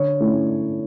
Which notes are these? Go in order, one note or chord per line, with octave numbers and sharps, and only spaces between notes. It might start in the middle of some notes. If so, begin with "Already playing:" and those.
Already playing: D3 C#5
A3 C#4 E4